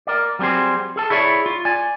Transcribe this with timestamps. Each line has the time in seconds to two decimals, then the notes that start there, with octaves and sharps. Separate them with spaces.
0.07 A#4 D5
0.39 F#3 G3 C4 G#4 C5
0.96 G#4 A4 A5
1.10 E4 G#4 C#5 D5 E5
1.46 F4
1.65 D5 G#5